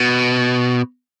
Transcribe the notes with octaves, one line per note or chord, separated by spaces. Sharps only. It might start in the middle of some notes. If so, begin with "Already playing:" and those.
Already playing: B2